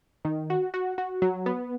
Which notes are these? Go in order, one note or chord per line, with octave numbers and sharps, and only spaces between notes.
D#3
F#4
F#4
F#4
F#3
B3